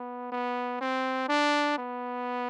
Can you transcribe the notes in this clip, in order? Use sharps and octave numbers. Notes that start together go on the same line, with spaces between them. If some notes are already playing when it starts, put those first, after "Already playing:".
Already playing: B3
B3
C4
D4
B3